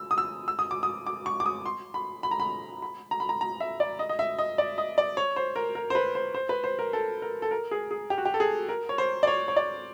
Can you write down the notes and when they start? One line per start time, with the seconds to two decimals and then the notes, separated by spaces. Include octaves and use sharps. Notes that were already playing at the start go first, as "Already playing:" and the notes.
Already playing: E6
0.11 D#6
0.18 E6
0.48 E6
0.59 D#6
0.71 D6
0.83 D#6
1.07 D6
1.26 C#6
1.40 D6
1.46 D#6
1.66 C6
1.94 B5
2.23 B5
2.31 A#5
2.40 B5
2.82 B5
3.11 A#5
3.20 B5
3.29 A#5
3.41 A#5
3.60 E5
3.80 D5
3.99 D#5
4.09 D#5
4.19 E5
4.39 D#5
4.58 D5
4.78 D#5
4.98 D5
5.17 C#5
5.36 C5
5.56 A#4
5.75 A#4
5.90 C5
5.95 B4
6.15 C5
6.34 C5
6.49 B4
6.64 C5
6.79 A#4
6.93 A4
7.22 A#4
7.42 A4
7.51 A#4
7.71 G#4
7.91 G#4
8.10 G4
8.18 F#4
8.25 G4
8.34 A4
8.40 G#4
8.69 A#4
8.89 C#5
8.98 C5
9.23 D5
9.27 C#5
9.48 C#5
9.56 D5